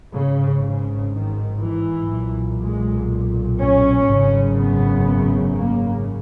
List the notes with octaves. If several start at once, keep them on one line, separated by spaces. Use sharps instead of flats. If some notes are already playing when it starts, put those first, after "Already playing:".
G#1 G#2 C#3
C#3
D#3
E3
B1 A#2
G#3
C#4
G#1 F#2 C#3
B3
A#3